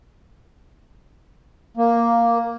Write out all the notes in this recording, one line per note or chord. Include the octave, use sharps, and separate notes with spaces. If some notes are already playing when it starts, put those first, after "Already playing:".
A#3